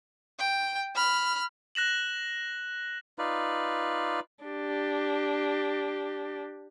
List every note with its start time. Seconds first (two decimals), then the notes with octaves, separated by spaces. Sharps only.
0.38 G5
0.95 B5 F6
1.75 F#6 A#6 E7 F#7
3.18 D#4 F4 B4 D5
4.44 D4 G4